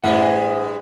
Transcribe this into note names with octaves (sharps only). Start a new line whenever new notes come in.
A1 G2 G#3 C5 E5 F#5